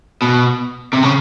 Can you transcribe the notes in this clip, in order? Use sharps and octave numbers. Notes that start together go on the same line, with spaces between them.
B2
C3
C#3